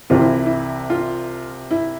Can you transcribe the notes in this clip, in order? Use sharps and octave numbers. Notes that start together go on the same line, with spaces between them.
C2 C3 E3 F4
E4
E4
F4
E4